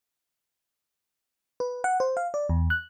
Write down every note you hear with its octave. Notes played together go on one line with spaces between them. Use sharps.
B4
F#5
C5
F5
D5
E2
F#6